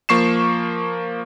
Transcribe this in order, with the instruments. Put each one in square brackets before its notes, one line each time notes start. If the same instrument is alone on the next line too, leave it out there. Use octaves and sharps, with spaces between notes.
[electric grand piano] F3 A#3 C#6 C7 E7